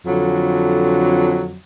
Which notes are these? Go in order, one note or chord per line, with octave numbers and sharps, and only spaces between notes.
F2 D3 F#3